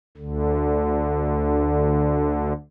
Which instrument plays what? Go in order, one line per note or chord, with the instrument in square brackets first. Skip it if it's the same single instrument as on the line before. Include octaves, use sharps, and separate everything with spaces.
[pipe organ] D2 D3